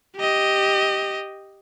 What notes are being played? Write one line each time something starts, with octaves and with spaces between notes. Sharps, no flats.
G4 D#5